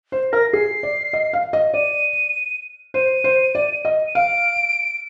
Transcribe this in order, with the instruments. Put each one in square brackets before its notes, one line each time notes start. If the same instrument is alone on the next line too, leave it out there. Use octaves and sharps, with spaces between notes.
[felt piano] C5
[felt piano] A#4 [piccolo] A#6
[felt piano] G#4 [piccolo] C7
[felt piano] D5
D#5
F5
D#5
[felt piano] D5 [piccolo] D#7
[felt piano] C5 [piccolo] D#7
[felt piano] C5
D5
D#5
[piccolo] D#7
[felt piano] F5 [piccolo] D7